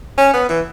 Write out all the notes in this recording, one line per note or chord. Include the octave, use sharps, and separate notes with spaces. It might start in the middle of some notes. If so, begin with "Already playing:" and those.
C#4
B3
E3